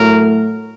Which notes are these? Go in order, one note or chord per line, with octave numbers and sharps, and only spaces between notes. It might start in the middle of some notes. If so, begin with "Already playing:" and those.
Already playing: A2 F#3 A3 A#4